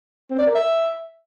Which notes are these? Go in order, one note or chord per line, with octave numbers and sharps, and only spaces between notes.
C4
D5
A#4
E5